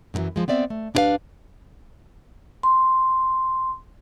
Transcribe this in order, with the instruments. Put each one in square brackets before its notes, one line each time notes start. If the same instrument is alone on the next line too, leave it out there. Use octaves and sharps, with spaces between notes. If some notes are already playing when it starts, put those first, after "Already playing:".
[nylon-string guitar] F#2 B2 D3 E3 F#3
F3 G#3
B3 C4 D5 E5
A3
D2 D4 E4 G4 B4 F5
[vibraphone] C6